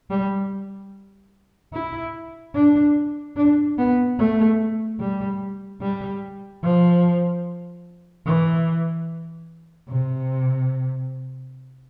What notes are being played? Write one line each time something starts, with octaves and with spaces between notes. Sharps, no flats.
G3
E4
D4
D4
B3
A3
G3
G3
F3
E3
C3